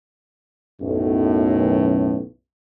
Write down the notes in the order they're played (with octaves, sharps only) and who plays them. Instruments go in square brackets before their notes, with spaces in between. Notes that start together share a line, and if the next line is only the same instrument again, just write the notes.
[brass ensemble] B1 F#2 A2